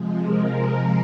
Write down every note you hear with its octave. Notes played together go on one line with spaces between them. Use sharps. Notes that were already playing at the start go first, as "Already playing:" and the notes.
Already playing: C3 F3 G#3
A#4